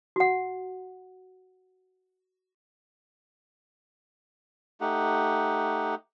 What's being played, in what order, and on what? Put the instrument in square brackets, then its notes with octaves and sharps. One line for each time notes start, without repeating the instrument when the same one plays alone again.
[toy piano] F#4 F#5
[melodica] A3 D#4 G4 F#5